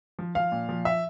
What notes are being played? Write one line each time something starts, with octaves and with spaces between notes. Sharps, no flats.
F3
F3 F5
A#2
F3
E5